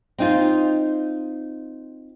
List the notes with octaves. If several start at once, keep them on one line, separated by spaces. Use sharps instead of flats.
C4 D#4 F4